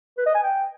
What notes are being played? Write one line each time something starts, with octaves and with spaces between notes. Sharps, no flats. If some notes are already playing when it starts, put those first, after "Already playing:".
B4
D#5
G#5
G5